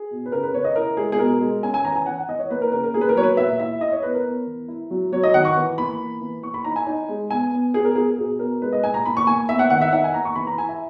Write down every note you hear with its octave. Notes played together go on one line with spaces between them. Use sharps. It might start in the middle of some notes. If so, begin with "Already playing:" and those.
Already playing: G#4
B2
B4
C#3 A#4
B4
C#3 C#5
D#5
E4 A#4
G#3 G#4
G#4
B2 A#4
G#3
C#4 G#5
G#5
E3 A#5
G#5
E3 F#5
F#5
E3 D#5
C#5
A#3 B4
A#4
C#3 A#4
A#4
A#3 G#4
B4
A#4
F#3 C#5
B4
A#2 E5
E4 E5
E4 D#5
C#5
B3 B4
A#4
B3
E3
E4
F#3
F#3 C#5
D#5
D#3 F#5
C#6
E3
A#3 B5
E3
E3
A#3 C#6
B5
D#4 A#5
G#5
D#4
G#3
B3 G#5
B3
B3 G#4
A#4
B3 G#4
B2 G#4
B3 A#4
G#3 B4
D#5
A#2 G#5
A#5
A#3 B5
C#6
A#3 G#5
B3 E5
F#5
D#3 F#5
E5
D#4 F#5
G#5
A#3 A#5
C#6
E3 B5
A#5
E4 G#5
E5